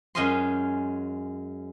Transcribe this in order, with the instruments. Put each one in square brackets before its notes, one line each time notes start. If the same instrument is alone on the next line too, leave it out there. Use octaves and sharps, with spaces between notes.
[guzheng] F#2 G#3 C#4 F4 D#5 C6